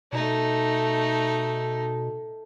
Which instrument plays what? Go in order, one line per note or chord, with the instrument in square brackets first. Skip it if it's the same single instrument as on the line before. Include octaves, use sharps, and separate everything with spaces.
[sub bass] B2 [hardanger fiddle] A3 D#4